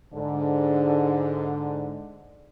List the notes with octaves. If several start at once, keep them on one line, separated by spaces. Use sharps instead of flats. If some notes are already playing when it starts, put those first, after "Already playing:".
G#2 D3